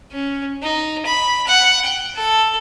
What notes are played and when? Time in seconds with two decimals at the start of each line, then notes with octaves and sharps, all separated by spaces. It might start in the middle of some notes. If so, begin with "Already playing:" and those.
0.12 C#4
0.63 D#4
1.06 B5
1.47 F#5
1.85 G5
2.15 A4